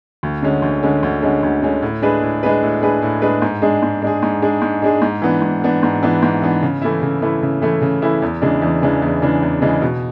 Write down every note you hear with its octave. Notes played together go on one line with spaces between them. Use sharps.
D2
D3 G#3 C#4
D2
D3 G#3 C#4
D2
D3 G#3 C#4
D2
D3 G#3 C#4
A2
G#3 D4 G#4 B4
A2
G#3 D4 G#4 B4
A2
G#3 D4 G#4 B4
A2
G#3 D4 G#4 B4
G#2
G#3 D4 G#4
G#2
G#3 D4 G#4
G#2
G#3 D4 G#4
G#2
G#3 D4 G#4
G#2
E3 B3 D4
G#2
E3 B3 D4
G#2
E3 B3 D4
G#2
E3 B3 D4
C#3
E3 A3 E4
C#3
E3 A3 E4
C#3
E3 A3 E4
C#3
E3 A3 E4
E2
C#3 E3 G#3 D4
E2
C#3 E3 G#3 D4
E2
C#3 E3 G#3 D4
E2
C#3 E3 G#3 D4
B2